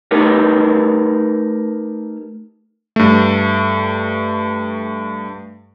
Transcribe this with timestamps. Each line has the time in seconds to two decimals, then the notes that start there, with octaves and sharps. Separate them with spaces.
0.11 A3 D#4 G4 A#4 B4
2.96 G2 A3